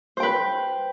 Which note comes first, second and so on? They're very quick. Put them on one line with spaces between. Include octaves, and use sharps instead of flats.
C5 G5 B4